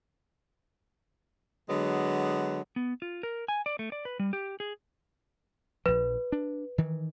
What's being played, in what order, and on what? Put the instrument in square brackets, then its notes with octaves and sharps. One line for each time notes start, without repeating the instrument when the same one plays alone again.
[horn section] D3 F#3 G#3 B3
[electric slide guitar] B3
F4
A#4
G#5
D5
A3
D5
B4
G3
G4
G#4
[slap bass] A#1 F3 [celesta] B4
[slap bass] D4
D#3 E3